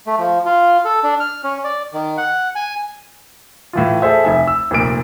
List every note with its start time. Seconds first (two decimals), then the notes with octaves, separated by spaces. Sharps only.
0.07 A3
0.18 F3
0.46 F4
0.85 A4
1.04 D4
1.20 F6
1.44 C#4
1.64 D5
1.93 D#3
2.17 F#5
2.56 G#5
3.73 A2 E3 F4
4.02 G#4 A4 C5 E5
4.24 F1 E5 G#5
4.47 E6
4.71 F1 A#2 D7